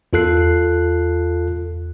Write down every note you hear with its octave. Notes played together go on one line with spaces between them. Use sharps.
E2 F4 A4 F#6 C7